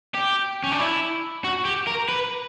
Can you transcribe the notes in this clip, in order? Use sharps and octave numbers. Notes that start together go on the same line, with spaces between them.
G4
C#4
D4
E4
F#4
G4
A#4
B4